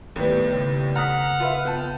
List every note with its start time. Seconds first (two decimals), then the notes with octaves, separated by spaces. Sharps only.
0.16 D#2 A2 G3 B3 B4
0.52 C#3
0.95 F#5 A#5 D#6 F6 B6
1.40 F4 B4 E5
1.65 B3 G5 A5